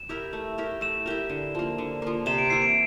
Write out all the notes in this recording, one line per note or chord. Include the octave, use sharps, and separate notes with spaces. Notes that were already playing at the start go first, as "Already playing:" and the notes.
Already playing: E7
E4 G4 A#4
A3
E4 G4 A#4
A3 E7
E4 G4 A#4
D3
F3 A#3
D3
F3 A#3
C3 E7
D7
E3 A#3 E4 C7
D7